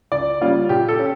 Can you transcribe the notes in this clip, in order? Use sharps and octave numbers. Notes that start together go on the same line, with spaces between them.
C#2 D5
C#3 G3 A#3 C#4 F4
A#2 G4
A4
C#4